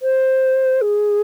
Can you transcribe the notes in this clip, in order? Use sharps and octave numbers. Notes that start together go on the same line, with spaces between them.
C5
G#4